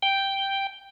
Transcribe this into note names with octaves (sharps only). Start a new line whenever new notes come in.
G5